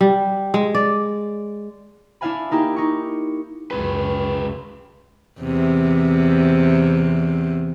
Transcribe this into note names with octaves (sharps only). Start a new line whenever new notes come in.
G3
G#3
D5
D4 E4 E5 F5 G#5 B5
A#3 D#4 E4 G4
D#4 C#6
C#2 F#2 G#3 B4
E2 C3